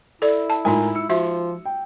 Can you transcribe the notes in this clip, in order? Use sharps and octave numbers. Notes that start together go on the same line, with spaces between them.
E4 A4 D5
A5
A2 G#3 D#4 F4 A#4 G#5
E6 C#7
F3 F#4 E5
G5